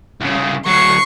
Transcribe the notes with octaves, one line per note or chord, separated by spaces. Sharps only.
C2 C#3
D2 F#3 C#6 C7